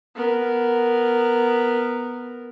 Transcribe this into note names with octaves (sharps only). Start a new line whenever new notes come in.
B3 A#4